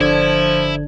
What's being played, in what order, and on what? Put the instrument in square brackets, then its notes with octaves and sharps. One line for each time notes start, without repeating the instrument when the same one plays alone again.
[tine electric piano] G1 D3 G#6 [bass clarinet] F3 [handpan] D4 [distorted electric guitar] E4